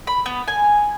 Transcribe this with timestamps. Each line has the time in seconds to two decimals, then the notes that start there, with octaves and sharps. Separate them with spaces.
0.07 B5
0.26 B3
0.48 G#5